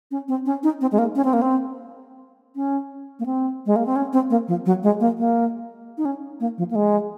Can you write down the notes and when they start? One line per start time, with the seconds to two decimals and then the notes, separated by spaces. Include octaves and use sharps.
0.11 C#4
0.28 C4
0.46 C#4
0.63 D#4
0.81 C4
0.92 G#3
0.98 A#3
1.16 C#4
1.24 C4
1.33 A#3
1.42 C4
2.56 C#4
3.20 A#3
3.26 C4
3.66 G#3
3.76 A#3
3.86 C4
3.96 C#4
4.13 C4
4.30 A#3
4.48 F3
4.66 F#3
4.83 G#3
5.00 A#3
5.18 A#3
5.98 D#4
6.05 C#4
6.40 A#3
6.58 F3
6.71 A#3
6.75 G#3